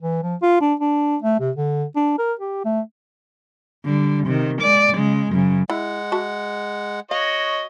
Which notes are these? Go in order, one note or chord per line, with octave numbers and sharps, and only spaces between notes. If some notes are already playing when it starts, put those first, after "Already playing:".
E3
F3
F4
D4
D4
A3
C3
D3
D4
A#4
G4
A3
D3 G3
C3 D#3
G#3 D5
C#3 G#3
F#2 C#3
G#3 E4 F#5
F#4 E5 A5
F#4 C#5 D#5 F5